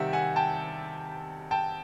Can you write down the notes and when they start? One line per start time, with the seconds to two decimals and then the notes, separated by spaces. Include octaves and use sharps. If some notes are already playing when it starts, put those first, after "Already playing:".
Already playing: C3 D#3 G3 C4 E5 F#5
0.13 F#5 G#5
0.36 G5 A5
1.51 G5 A5